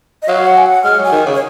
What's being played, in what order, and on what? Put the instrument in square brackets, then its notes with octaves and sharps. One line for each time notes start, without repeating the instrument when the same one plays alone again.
[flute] D#5
[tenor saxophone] F#3 [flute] F5
[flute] F#5
G#5
F#5
[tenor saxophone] G#3 [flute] F6
[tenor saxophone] F#3 [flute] G#5
[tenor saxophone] D#3
C#3
[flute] C#5